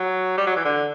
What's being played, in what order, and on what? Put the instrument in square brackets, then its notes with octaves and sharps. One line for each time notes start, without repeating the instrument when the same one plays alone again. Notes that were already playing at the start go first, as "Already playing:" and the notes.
Already playing: [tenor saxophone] F#3
G3
F#3
E3
D3